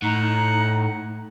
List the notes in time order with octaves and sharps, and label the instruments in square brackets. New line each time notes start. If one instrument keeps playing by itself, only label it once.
[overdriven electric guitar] A2 [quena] D#4 [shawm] F#5